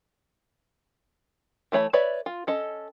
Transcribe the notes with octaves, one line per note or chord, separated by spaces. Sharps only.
E3 A3 C#5 B5
B4 C#5 D5 E5 B5
F4
C#4 A4 D#5